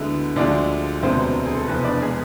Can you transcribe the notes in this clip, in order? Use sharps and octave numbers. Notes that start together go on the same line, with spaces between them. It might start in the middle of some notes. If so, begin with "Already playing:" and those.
Already playing: D2 D3 G#3 B3 E4
D2 D3 F3 G#3 D4 D5
E1 D2 C3 G#3 B3 C4 C5
G#4
A4
F1 E2 B2 B3 B4
C5
D4 D5
G#3 G#4